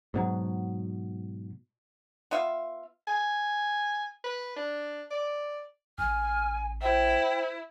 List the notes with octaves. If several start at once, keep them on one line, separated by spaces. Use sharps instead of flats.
G#2 B2 F#3
B3 F4 E5 F5
G#5
B4
D4
D5
A1 G#5 F6
E4 C5 G5